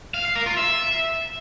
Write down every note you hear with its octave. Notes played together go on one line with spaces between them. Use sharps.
F5
F5
A#4
F4
E5